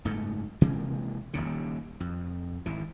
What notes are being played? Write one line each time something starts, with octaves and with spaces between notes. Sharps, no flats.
F#1 G#2 A3
C3 E3 G#3 A#3
D#1 A1 D#2 C#3
F2
G#1 E3